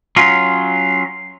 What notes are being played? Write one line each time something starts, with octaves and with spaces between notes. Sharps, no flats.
F#3 C#4 F4